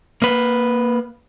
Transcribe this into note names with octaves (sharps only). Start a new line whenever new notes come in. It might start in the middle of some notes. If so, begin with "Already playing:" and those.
A#3 B4